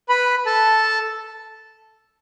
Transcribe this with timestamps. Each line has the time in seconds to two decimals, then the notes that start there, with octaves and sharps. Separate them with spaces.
0.09 B4 B5
0.46 A4 A5